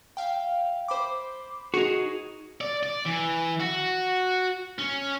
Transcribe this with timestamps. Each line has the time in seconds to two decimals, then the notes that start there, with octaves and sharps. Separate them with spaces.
0.17 E5 F5 G5
0.88 C5 B5 D6
1.74 D#4 F#4 G#4
2.61 D5
2.83 D5
3.06 E3
3.60 F#4
4.79 C#4